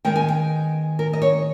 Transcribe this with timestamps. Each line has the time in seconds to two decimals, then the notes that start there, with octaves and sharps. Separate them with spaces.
0.05 D#3 G#3 B3 G5
0.16 G#5
0.28 G5
0.99 A#4
1.13 D#5
1.22 C#5